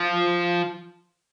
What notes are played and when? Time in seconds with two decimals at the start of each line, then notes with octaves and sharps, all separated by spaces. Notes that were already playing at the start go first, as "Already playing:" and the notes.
Already playing: F3